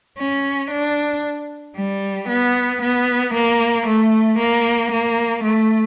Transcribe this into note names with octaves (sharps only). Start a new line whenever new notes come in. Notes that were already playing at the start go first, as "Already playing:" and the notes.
C#4
D4
G3
B3
B3
A#3
A3
A#3
A#3
A3